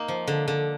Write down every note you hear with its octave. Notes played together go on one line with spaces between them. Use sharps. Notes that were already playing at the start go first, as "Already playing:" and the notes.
Already playing: A#3 D#4
F3
D3
D3